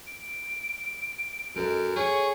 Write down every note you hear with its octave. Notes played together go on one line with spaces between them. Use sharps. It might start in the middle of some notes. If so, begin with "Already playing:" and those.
D7
F#2 A4 A#4 D#5
G#4 C#5 C#6